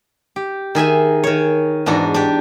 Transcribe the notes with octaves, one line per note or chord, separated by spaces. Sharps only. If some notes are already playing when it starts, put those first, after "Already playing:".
G4
D#3 G#4 E5 G#5
D#3 G#4 C#5
E2 G#2 D4 F#4 A#5
D4 G4